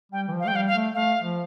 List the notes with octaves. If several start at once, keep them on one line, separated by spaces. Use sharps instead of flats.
G3 G5
E3
F3
F5
A3 G5
G3 F5
F5
A3
A3 F5
F3